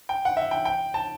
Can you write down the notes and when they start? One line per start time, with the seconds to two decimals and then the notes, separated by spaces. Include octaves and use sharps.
0.09 G5
0.25 F#5
0.37 E5
0.51 G5
0.65 G5
0.94 A5